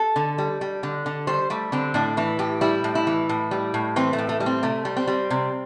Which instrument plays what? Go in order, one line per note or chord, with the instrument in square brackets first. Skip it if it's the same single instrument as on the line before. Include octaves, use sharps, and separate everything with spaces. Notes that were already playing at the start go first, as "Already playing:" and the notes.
Already playing: [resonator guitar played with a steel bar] A4
D3
G3
G3
D3
D3
G3 C5
G3 A3
D3 C4
A2 D4
E3 E4
A2 G4
G3 E4
A2
E4
E3
A2
G3
A2
E3 C4
A3
A2
A3
G3
C4
C3 A3
G3
C4
G3
C3